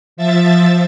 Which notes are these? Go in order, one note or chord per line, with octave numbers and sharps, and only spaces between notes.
F3 E5 A6